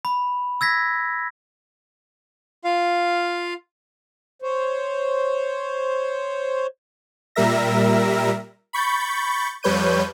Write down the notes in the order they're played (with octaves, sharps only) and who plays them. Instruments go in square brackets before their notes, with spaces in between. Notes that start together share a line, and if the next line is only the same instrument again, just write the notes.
[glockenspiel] B5
E6 G#6 A#6 B6
[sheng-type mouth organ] F4 F5
[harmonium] C5 C#5
[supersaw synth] A#2 G3 A#4 E5 A#6
B5 C#6 G6 A6
F2 G3 B4 C#5 G6 D#7